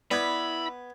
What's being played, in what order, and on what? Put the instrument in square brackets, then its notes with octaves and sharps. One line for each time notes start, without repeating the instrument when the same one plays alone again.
[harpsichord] B3 [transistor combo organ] E4 [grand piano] D5 G#6 [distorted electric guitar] B5